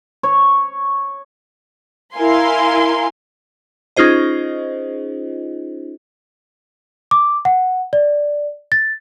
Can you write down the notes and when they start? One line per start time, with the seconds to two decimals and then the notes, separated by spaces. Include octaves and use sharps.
0.23 C#5
2.15 E4 A#4 F5 G#5 C6
3.97 C#4 D#4 F4 G#4 C5 D#5
7.11 D6
7.45 F#5
7.93 D5
8.72 A6